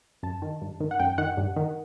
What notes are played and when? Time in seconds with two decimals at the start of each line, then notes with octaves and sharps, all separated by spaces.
0.23 F#2 A5
0.42 D#3
0.61 G2
0.80 D#3
0.91 F#5
1.00 F#2 G5
1.18 D#3 F#5
1.37 G2
1.56 D#3